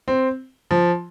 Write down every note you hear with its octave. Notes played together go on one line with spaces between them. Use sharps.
C4
F3